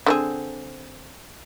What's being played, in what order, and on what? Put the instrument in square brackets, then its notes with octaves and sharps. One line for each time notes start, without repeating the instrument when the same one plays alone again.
[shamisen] D3 C4 G#4